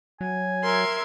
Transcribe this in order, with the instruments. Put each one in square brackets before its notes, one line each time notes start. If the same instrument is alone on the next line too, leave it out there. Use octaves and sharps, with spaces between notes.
[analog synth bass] F#3 [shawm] G#5
[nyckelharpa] A#4 [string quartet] E5 C6 G#6